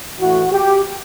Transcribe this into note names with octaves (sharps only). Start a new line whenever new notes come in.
A2 E3 F#4
G4